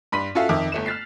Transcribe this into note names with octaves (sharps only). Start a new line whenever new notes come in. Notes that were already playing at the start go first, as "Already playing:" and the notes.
G2 B5 C6 B6 D#7
C#4 F4 F#4 A4 E5 F5
F2 D#3 E5 D6
G1 A3 E7
F6 F#6 A6 B6 C7